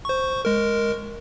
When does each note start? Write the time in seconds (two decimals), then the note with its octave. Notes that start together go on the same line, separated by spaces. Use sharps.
0.05 C5 C#6
0.45 G#3 A#4